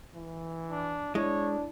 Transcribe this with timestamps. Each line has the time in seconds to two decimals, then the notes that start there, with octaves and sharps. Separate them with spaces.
0.16 E3
0.71 D4
1.15 G#3 D4 E4 C#5